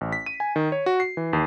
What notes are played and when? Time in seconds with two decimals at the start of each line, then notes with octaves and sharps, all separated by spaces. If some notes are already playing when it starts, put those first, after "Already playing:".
0.01 A1
0.12 B6
0.26 D#7
0.40 G#5
0.56 D#3
0.72 C#5
0.86 F#4
1.00 C7
1.17 E3
1.33 D#2